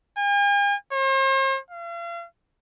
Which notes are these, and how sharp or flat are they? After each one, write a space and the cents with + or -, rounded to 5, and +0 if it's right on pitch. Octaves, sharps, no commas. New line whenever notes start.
G#5 -45
C5 +45
F5 -40